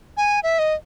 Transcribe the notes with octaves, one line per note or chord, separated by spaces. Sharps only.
G#5
E5
D#5